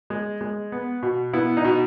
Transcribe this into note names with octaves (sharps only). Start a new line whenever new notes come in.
G#3
G#3
B3
B2
B3 E4
D#4
B2